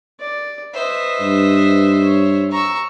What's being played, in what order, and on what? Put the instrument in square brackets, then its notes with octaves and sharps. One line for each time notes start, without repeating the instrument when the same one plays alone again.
[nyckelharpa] D5
[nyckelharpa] B4 D#5 [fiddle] C5 E5
[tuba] G2
[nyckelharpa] C#5
[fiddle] A#5 E6 [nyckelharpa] C#6